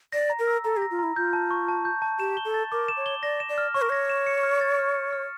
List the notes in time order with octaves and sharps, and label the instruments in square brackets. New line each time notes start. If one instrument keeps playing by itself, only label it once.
[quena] D5 [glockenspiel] A#6
[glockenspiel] A#5
[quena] A#4
[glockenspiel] E6
[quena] A4 [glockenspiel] A#5
[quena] G4
[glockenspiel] A#6
[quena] F4
[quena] E4 [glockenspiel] A#5
[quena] F4 [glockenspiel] G6
[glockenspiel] A5
C#6
A5
G6
A5
[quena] G4 [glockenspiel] E7
[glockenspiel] G7
[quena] A4
[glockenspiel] A6
[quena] A#4 [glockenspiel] D6
[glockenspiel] E7
[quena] C#5
[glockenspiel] G7
[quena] D5 [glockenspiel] A#6
[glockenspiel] E7
[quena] D5
[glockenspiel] F6
[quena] C#5 [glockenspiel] C#6
[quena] A#4
[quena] C#5 [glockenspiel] A#6
[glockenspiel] E7
C#7
F6
A6
F6
C#7
F6